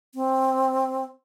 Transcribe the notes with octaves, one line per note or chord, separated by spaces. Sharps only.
C4